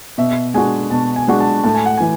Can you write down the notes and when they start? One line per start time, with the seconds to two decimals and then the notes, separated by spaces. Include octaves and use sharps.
0.18 B2 E5
0.54 G#3 D4 F#4 G#5
0.91 B2 A5
1.16 G#5
1.28 G#3 D4 F#4
1.40 A5
1.64 A2 A5
1.75 G#5
1.86 F#5
1.97 E3 G#5